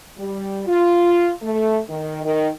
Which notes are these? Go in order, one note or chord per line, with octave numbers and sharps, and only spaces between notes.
G3
F4
A3
D#3
D#3